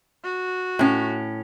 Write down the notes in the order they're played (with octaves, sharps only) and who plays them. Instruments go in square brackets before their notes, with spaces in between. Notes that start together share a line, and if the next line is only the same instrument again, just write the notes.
[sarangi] F#4
[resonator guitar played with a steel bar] A2 C#4